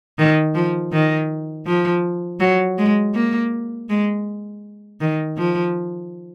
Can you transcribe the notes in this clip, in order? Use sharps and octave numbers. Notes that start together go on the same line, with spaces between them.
D#3
F3
D#3
F3
F#3
G#3
A#3
G#3
D#3
F3